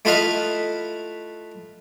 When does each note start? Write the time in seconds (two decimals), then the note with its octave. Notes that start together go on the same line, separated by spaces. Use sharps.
0.05 A3 E4 F4 B4 D#5 F5